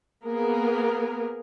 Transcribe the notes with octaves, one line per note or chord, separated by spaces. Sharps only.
A#3 B3 G#4 A#4